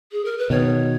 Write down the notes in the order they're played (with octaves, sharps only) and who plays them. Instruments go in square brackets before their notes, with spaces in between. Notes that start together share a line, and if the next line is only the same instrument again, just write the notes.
[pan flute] G#4
A#4
B4
[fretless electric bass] B2 D#3 [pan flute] C#5